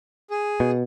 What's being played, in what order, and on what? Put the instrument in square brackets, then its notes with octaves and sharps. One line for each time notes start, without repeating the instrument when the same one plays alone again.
[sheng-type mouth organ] G#4
[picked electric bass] B2